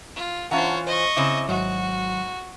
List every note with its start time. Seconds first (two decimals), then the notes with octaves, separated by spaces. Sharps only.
0.16 F4
0.51 E3 C#4 F4 C5 C#5 F#5 A5 A#5
0.87 C5 D#5 C#6
1.17 C#3 C4 E4 D6
1.49 G#1 G#2 F#3 F#4